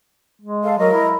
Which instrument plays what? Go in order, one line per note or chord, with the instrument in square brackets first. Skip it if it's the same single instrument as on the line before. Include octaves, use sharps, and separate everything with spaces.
[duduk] G#3
[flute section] A4 F5
[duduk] F#3 [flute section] A#4 D#5
[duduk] E4